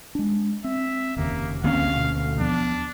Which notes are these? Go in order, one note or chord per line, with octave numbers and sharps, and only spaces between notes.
G#3 D4
C4 E5
F1 D#2 C#3 A#3
D2 D#3 A#3 C4 C#4 F5
B2
D#2 F3 B3 D4